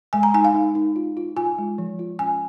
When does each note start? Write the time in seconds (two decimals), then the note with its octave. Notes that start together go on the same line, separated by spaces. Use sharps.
0.13 G#3 G#5
0.23 A#5
0.34 D#4 G#5
0.45 F5
0.54 D#4
0.75 D#4
0.96 F4
1.17 F4
1.37 F4 G#5
1.58 G#3
1.78 F3
1.99 F4
2.19 C#4 G#5